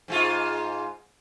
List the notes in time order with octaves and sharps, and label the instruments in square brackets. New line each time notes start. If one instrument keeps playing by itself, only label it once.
[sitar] G#2 G#3 F4